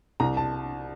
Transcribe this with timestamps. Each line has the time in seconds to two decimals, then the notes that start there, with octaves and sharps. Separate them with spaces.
0.20 C2 A#5
0.37 A5